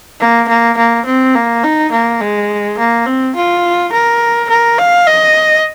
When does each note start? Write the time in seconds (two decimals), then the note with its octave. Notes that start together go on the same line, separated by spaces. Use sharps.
0.20 A#3
0.48 A#3
0.78 A#3
1.06 C4
1.35 A#3
1.64 D#4
1.92 A#3
2.21 G#3
2.78 A#3
3.06 C4
3.35 F4
3.92 A#4
4.50 A#4
4.78 F5
5.07 D#5